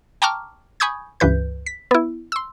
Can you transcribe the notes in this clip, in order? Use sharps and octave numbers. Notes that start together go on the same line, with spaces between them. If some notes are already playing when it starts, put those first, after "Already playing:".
G5 A5 A#5 C#6 D6 F6
G#5 B5 C#6 D#6 G6 G#6
C#2 G2 E3 B4 G6
B6
B3 E4
C6 E6